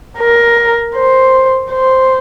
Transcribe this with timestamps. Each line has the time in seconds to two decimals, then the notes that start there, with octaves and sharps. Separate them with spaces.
0.18 A#4
0.95 C5
1.72 C5